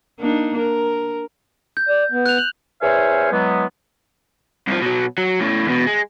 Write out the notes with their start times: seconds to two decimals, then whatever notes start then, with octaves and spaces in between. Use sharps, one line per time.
0.20 A#3 D4 D#4
0.58 A#4
1.77 G6
1.89 D5
2.12 B3
2.26 F#6 F7
2.38 F#7
2.81 E2 C5 C#5 E5 F5 G#5
3.32 E3 F#3 G#3 B3
4.67 C2 F3
4.82 B2 F#3
5.18 F#3
5.40 A2 C#3
5.66 E2 B2
5.86 G#3